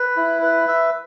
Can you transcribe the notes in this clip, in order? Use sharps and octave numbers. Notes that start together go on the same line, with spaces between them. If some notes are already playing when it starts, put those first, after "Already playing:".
Already playing: B4
E4
B4
E5